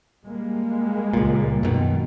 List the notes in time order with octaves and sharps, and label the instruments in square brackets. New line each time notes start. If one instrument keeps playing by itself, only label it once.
[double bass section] G3 G#3 A#3
[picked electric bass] C#2 A#2
F#2 B2 D#3